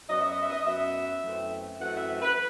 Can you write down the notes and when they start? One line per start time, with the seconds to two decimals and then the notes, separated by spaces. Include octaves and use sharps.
0.09 F#2 F#3 B3 D#5
0.19 E5
0.30 D#5
0.40 E5
0.50 D#5
0.66 F#2 F#3 B3 E5
1.22 F#2 E3 A3 C4
1.79 F#2 E3 A3 C4 F#5
1.94 E5
2.22 B4